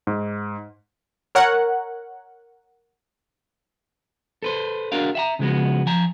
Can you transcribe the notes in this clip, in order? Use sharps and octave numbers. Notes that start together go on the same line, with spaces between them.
G#2
A#4 C#5 F#5
A4 B4 C5
D4 F#4 G#4 A#4 F5
E5 F#5 A#5
C#3 F3 G#3 B3 F#4
F3 G#5 A#5